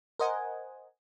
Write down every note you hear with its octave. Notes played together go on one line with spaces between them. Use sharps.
A#4 C5 D#5 F#5 G#5